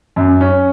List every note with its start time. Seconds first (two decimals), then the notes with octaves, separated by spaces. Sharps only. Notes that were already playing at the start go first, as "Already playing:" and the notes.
0.16 F#2
0.41 C#4